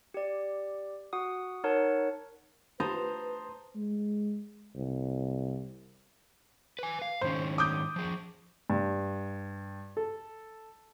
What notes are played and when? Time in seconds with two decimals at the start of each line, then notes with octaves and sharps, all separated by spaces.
0.14 G4 D5
1.13 F#4 F#5 D#6
1.64 D#4 A#4 C#5 F#5 A5
2.80 B4 C5 A5 A#5 D#6
3.75 G#3
4.76 C2
6.79 B4 G#5
7.02 F5
7.21 G#2 D#3 C#4 C5
7.58 D6 D#6 G6
7.96 F3 G#4
8.70 G2
9.97 A4